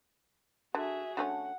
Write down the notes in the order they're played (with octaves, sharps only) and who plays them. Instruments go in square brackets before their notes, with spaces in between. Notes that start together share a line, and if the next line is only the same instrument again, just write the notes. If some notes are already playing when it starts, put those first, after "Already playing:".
[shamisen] D3 [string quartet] F#4 G#4 E5
[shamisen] D3 A3 C#4 [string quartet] F#5